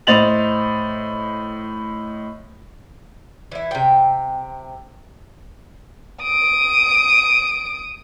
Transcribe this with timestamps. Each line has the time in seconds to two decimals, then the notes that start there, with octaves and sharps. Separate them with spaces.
0.07 A2 C5 D#5 A6 F7 F#7
3.52 E3 E4
3.71 C3 G5
6.23 D#6 D7